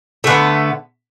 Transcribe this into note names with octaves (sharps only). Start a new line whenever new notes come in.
D3 A3 B3